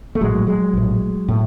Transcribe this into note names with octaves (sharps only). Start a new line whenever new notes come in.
A3
A#1 A2 F#3 G#3
F#3 G#3
A#1 A2
A2